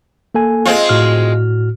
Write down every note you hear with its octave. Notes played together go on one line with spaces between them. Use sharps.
A#3 A4 G#5
G#3 C4 F4
A2 F#4 F6